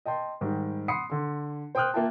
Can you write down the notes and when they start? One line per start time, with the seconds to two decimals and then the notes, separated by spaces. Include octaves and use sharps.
0.06 D#5 G5 A5 C6
0.41 G#2 D#3 G3
0.88 F#5 B5 C6 D#6 C7 C#7
1.10 D3 C6
1.75 C5 G5 C6 D#6 F6 F#6
1.94 A#3 F4 E5 F5 G5 A5